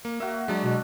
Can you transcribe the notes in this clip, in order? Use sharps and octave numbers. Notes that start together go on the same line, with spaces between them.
A#3
A#3 F#4 E5
F#3 G#3 D4
B2